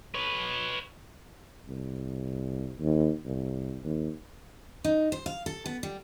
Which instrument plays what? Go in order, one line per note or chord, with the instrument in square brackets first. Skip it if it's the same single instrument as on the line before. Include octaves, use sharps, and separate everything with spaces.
[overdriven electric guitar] B4 C#5
[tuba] C2
D#2
C2
D#2
[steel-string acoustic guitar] D#4
C5
F5
A4
B3
G3